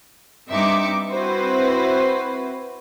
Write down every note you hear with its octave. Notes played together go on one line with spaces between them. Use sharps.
G2 C4 D#4 E5 D6 C#7
C4 E4 F#4 B4 C5